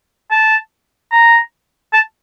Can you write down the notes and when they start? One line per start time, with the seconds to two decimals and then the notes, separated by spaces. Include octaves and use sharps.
0.31 A5
1.12 A#5
1.93 A5